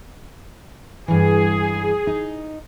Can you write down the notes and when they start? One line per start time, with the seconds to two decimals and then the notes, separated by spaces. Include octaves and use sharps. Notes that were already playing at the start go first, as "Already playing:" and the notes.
1.08 G2 E3 G#4
2.07 D#4